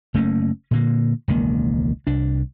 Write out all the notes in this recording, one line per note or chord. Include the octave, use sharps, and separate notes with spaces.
F#1 A3 A#3 C#4
A#2 D3 A#3
E1 C#2 D#3 A#3
C2 D4